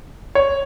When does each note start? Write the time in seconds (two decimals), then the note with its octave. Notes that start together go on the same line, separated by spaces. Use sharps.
0.35 C#5